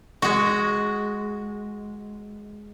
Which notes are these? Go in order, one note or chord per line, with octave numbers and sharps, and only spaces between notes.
G#3 F#4